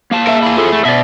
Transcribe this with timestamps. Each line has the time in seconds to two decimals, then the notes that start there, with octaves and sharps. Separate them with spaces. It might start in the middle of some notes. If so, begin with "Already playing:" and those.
0.11 A#3 F5 A5
0.27 A#4 E5
0.43 E4 G#4
0.57 F4 A4
0.72 A3
0.85 B2 D5 E5